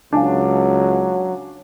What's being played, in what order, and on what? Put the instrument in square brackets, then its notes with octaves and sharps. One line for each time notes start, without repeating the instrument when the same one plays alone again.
[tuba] C#2 [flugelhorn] F#3 [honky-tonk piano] D4 [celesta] F5 G#5 A5